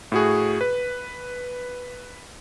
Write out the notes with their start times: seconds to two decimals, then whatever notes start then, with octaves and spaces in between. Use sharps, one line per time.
0.12 A2 F#4 G#4
0.61 B4